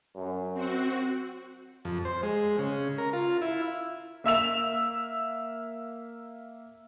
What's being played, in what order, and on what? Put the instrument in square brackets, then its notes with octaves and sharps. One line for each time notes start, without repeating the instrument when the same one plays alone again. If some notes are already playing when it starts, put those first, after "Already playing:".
[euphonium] F#2
[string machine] C4 F#4
[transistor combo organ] F2
C5
G#3
C#3
A#4
F4
E4
[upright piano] A#3 E5 E6 F7